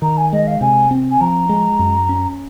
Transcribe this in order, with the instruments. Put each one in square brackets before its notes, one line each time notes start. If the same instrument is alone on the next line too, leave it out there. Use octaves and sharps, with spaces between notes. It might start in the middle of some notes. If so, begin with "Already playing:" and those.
[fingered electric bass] D#3 [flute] A#5
[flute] G#5
[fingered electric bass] G#3 [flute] D#5
[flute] F5
[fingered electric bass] C3 [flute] G#5
[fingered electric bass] C4
[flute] G#5
[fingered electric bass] F3 [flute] A#5
[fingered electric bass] G#3
F#2
C#4